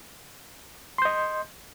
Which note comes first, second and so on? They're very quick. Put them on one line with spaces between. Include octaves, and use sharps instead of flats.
C6 G6 D#5